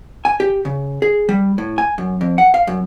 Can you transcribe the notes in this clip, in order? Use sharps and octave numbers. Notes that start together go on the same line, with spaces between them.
G#5
G4
C#3
G#4
G3
A2
G#5
F#2
F2
F#5
F5
F#2